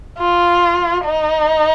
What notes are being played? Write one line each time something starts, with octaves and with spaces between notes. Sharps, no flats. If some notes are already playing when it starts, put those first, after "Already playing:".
F4
D#4